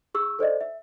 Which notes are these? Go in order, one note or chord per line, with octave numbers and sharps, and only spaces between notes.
G#4 C#6 E6
A4 C5 D5 D#5
E5